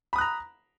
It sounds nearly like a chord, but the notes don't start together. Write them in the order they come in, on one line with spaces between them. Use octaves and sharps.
B5 D#6 F#6 A#5